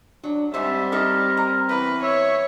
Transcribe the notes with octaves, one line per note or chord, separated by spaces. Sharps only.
F#3 D4
G#2 G3 C4 C5 E5
D4 D#4 A4 A#4
A#5
E2 E3 B4
C#5 E5